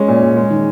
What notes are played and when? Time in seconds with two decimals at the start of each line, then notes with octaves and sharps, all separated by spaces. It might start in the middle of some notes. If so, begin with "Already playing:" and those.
Already playing: G#3 C#4
0.08 A#2
0.23 A#2
0.37 G#3
0.51 D#3